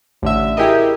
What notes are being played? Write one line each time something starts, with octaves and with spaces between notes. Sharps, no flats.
A1 D3 E5
E4 G4 G#4 A#4 D#5